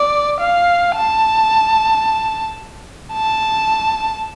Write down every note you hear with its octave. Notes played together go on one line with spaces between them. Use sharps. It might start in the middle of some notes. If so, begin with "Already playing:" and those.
Already playing: D5
F5
A5
A5